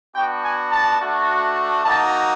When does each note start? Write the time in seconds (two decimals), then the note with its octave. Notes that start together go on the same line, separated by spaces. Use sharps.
0.15 B3 D4 F#4 G5
0.44 G#5
0.71 A5
0.99 A3 D4 F#4
1.83 A#3 D#4 F#4 A5